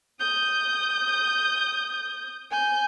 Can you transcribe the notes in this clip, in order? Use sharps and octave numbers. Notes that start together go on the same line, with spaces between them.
D#6 G6
G#5 G6